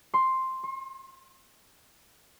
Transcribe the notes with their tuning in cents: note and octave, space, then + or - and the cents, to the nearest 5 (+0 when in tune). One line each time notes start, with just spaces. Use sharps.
C6 +5
C6 +40